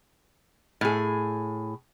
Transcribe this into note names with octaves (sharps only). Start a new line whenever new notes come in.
A2 G#4